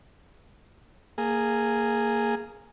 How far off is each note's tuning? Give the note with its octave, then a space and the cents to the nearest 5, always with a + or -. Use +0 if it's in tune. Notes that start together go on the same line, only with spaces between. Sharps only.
A#3 -15 G#4 +0